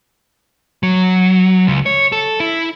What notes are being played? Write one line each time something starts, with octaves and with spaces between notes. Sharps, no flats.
F#3
C#2
C#5
A4
E4